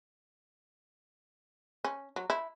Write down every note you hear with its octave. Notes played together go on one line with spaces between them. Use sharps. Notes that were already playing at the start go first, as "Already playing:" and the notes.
C#4
F#3
E4